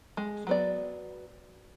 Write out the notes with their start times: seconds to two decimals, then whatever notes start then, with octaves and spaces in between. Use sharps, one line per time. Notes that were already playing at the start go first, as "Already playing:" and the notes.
0.17 G#3
0.47 F#3 B3 D5